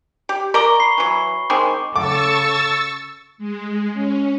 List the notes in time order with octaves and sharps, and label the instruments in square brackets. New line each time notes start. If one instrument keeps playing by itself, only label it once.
[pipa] G4
[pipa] A#4 D5 A#5 [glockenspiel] C#6 G7
[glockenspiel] B5 C#6 C7
[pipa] E3 F#3
[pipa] D#3 G#3 C4 [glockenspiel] D6
[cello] C#3 A4 [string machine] C#6 E6 A6 [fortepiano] D6
[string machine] G#3
C#4